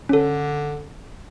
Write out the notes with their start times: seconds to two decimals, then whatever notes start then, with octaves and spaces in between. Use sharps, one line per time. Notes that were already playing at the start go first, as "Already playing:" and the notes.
0.09 D3 C#4 A4